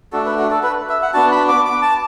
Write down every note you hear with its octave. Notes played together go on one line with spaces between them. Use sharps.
A3 D4 F#4 A4
B4
F#4
A4
B4
E5
F#5
B3 D4 F#4 A5
B5
D6
D6
A5